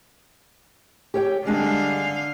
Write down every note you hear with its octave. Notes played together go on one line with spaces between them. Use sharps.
G4 C#5 G5
D3 G3 G#3 D4 F5